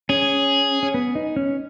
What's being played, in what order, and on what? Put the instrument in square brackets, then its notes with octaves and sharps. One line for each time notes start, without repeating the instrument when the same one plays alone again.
[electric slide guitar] C#4 [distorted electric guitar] G#4
[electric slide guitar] C#4
B3
D#4
C#4